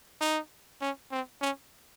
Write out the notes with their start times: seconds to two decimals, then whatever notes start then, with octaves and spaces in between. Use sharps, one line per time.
0.21 D#4
0.81 C#4
1.12 C4
1.42 C#4